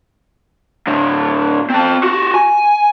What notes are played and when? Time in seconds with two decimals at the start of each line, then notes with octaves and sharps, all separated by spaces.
0.87 A2 D3
1.70 C4 A5
2.03 F#4 G4
2.34 G#5